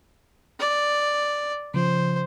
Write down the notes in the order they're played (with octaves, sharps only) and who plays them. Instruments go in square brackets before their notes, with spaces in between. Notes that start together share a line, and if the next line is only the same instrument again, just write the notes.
[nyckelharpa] D5
[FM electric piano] C#3 F3 [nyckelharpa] C5